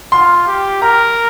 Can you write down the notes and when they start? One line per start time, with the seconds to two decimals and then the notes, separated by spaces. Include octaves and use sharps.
0.12 F4 C6
0.47 G4
0.82 A#4 A#5